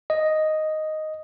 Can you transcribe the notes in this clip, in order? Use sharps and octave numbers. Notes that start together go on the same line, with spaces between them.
D#5